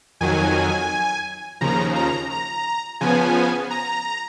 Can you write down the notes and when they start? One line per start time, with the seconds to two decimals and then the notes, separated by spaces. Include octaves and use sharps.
0.21 F2 D#3 F#3 G#5
1.61 D#2 C#3 F3 A#5
1.96 A#5
2.31 A#5
3.01 C#3 F3 B3 G#5
3.70 A#5